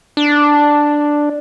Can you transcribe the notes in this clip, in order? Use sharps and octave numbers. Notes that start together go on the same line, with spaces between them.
D4